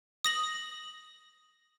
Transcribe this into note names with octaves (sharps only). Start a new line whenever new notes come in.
D#6 A#6 F#7